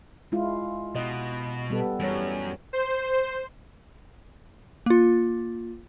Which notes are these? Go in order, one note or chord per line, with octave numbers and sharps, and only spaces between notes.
G#3 E4 F4
B2 D#5
G3 B3 A4
F#2 E3 G3 C#5
C5
A#3 F4